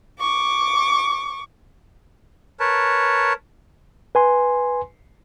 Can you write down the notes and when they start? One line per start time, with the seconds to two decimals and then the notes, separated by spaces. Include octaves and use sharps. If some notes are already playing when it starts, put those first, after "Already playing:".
0.20 C#6 D6
2.60 A#4 B4 C#5 A5
4.15 B4 G#5 C6